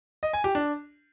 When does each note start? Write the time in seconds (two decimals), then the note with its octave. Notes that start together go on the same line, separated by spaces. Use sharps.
0.23 D#5
0.33 G#5
0.44 G4
0.55 D4